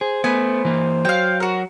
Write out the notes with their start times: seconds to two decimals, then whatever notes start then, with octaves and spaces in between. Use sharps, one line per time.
0.01 G#4 C5
0.24 A3 B3 G#5 B5
0.65 E3 A#3
1.05 F#3 F5 G5
1.40 F#4 A#4